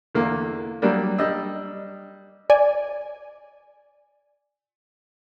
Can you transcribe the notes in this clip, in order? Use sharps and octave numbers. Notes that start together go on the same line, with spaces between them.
E2 D3 A#3
F#3 G3 A#3 D4
G3 D4 D#5 E6
D5 G#5